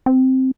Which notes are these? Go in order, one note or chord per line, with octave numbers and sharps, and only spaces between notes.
C4